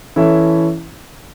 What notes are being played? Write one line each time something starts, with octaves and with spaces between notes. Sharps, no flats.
E3 C#4 E4 A4 E5